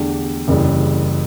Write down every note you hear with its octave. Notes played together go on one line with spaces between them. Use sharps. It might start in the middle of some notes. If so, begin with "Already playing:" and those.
Already playing: E2 D3 A3 D4 G4
F#1 F#2 C#3 E3 G3